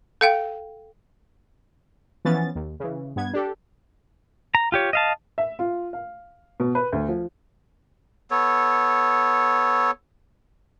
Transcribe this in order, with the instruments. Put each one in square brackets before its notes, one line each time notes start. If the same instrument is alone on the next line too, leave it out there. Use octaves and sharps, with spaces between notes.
[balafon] A4 F5 G5
[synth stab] E3 F3 B3 C#4 A6
D#2
C#3 E3
G2 B3 G#6
D4 G4 A4
[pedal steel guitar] A#5
F4 G4 C#5
D#5 F5 A5
[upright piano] E5
F4
F5
B2
B4
D2
F3
[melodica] B3 A4 C#5